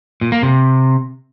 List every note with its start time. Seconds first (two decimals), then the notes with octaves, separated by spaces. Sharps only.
0.21 A#2
0.32 A#3
0.43 C3